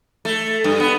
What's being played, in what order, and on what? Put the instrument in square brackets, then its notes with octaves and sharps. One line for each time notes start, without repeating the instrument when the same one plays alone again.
[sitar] A3
G2
B3